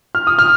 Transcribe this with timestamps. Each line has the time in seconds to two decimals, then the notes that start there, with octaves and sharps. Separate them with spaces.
0.15 F6
0.27 D#6
0.39 F6